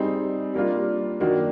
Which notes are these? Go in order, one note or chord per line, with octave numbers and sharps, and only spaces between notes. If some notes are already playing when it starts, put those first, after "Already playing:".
Already playing: G3 C4 D#4 G#4
G3 A#3 D4 F4
D#3 F#3 A#3 D4